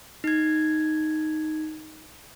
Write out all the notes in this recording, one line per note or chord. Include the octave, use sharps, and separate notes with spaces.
D#4 G#6